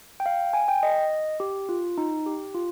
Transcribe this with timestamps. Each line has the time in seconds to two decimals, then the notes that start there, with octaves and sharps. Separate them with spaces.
0.20 G5
0.26 F5
0.53 G#5
0.68 G5
0.83 D#5
1.40 G4
1.69 F4
1.98 D#4
2.26 G4
2.55 F4